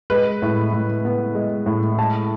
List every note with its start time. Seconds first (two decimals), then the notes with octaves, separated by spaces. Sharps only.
0.10 G#3 B4
0.42 A2
0.73 A2
1.05 B3
1.35 G#3
1.66 A2
1.97 G#3 A5